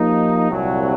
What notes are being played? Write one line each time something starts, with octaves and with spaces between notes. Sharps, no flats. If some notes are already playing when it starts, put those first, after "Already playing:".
Already playing: F3 A#3 D#4 G4
C2 A#2 F#3